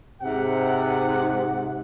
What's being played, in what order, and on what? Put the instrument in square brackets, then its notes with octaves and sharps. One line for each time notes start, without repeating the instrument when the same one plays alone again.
[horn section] G#2 C3 F#5